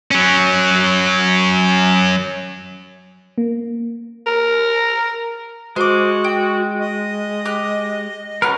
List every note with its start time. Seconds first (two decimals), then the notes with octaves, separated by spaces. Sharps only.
0.11 F#3 C#4
3.38 A#3
4.26 A#4
5.76 G#3 F#4 C5 D6
6.24 G5
6.79 D#5
7.45 G4 F#6
8.42 B3 C#4 F#4 A#4 F6 F#6